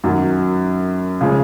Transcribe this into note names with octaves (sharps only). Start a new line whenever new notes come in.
F#2 D#3 F#3
C#3 F3 G#3 C#4